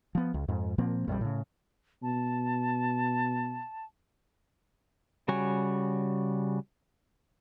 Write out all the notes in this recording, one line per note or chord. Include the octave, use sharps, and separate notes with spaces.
F3 B3
C#2
F2 G#2
A#2 F3 A#3 C4
A#1 F2 D3 G3
A2 C#3
B2 A5
C#3 G3 F#4 C#5 G#5